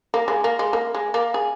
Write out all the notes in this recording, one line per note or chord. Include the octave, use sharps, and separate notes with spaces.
A#3
G#3
A#3
G#3
A#3
G#3
A#3
G#4